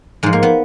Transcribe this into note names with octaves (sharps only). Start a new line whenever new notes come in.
G#2 F3 G#3
A#3
B3